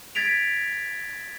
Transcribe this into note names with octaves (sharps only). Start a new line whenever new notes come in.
G#6 A6 B6 D7 F7